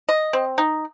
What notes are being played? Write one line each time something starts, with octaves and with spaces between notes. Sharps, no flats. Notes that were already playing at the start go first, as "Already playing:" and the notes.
D#5
C4
D#4